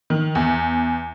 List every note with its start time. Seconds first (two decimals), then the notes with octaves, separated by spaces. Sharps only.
0.10 D#3
0.35 E2